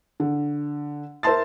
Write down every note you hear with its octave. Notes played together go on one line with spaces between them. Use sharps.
D3
A#4 C5 E5 A5 C6 A6